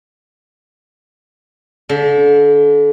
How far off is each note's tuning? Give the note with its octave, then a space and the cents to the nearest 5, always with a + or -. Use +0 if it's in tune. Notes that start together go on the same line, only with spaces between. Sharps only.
D3 -35 E5 +0